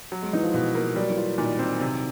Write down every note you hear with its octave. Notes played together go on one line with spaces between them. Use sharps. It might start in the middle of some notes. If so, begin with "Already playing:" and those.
F#3
G#3
E3 D#4
F3
B2
A#3
F#3 G3
E3
F4
A#2 D#3
C4
C3